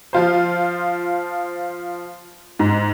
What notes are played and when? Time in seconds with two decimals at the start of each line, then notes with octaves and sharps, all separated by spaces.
0.13 F3 F4 C5
2.59 G#2